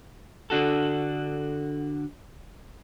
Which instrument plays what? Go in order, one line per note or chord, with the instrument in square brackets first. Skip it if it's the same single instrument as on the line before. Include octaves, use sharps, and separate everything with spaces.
[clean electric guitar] D3 D4 F#4 A4